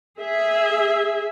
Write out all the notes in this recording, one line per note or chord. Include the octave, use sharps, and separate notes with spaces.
G#4 E5